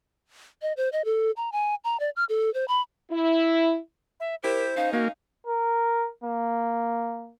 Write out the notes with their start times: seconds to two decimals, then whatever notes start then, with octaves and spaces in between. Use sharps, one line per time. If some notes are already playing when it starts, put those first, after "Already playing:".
0.62 D#5
0.77 C5
0.92 D#5
1.05 A4
1.37 A#5
1.52 G#5
1.84 A#5
2.00 D5
2.16 F6
2.29 A4
2.54 C5
2.68 B5
3.11 E4
4.20 E5
4.43 E4 G4 A#4 C5
4.77 C#4 D#4 F5
4.93 A#3 F#4 F5
5.46 A#4
6.24 A#3